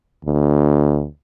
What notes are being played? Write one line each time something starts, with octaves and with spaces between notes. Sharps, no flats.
D2